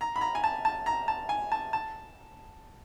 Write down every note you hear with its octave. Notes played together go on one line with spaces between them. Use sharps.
A#5
B5
A#5
G#5
A5
A5
A#5
A5
G#5
A5
A5